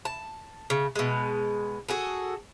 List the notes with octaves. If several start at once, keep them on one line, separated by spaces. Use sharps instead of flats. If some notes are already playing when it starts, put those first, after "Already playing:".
A5
C#3
B2 G#3
F#4 G#4 A4